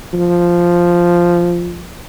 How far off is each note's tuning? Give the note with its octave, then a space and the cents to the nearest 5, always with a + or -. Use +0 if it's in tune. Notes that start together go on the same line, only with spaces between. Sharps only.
F3 -5